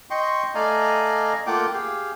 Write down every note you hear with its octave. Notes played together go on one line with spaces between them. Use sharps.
D#5 G5 C6 C#6
A3 D5 D#5 F5 G#5 A#5
A3 A#3 F4 F#5 G5 D6
G4 G#4 F5